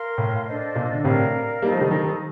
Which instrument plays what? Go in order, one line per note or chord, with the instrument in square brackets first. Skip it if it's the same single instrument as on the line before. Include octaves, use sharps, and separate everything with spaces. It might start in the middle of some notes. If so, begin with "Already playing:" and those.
Already playing: [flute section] A#4 F5 C6
[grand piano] A2
[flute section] D4 A4 C5 D#5
[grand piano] A#2
D3
[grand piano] A2 C3 [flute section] A#4 D5 F5
[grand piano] G3 A#3 [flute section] D#4 A4 C5 D#5
[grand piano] F3 A3
D#3 G3
D#3 G3